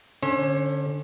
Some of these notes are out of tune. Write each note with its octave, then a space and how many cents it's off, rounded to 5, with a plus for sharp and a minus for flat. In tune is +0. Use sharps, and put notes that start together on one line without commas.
D3 +0 C#4 +0 C5 +45